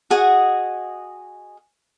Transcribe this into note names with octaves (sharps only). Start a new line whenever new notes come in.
F#4 G#4 D#5 F#5